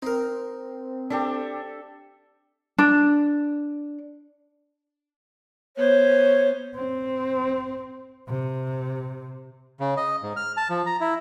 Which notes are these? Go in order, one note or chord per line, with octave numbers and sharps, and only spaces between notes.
C4 D#4 A#4
D4 G4 A4 E5
D4
B3 C5 C#5
C4
C3
C#3
D#5
G#2
F6
A5
F3
A#5
E4